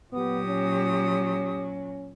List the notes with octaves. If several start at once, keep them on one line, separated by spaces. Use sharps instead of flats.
A#2 F#3 B3 G4 D#6
C#4